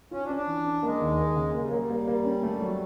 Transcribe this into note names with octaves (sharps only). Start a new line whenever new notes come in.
C#4 F4
D4
C#4
D4
E3
C#4
G#3 A#3
D#2
A#3
C#3
G#3 A#3
G3
F#3 A#3
G3
A#3
A#3
C#4
A3
F#3